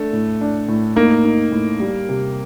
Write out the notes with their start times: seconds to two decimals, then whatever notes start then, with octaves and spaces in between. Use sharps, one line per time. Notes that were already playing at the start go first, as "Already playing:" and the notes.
Already playing: A3 D4
0.13 A2
0.41 D4
0.68 A2
0.96 A#3 D#4
1.25 D#4
1.52 A2
1.80 G3
2.09 C3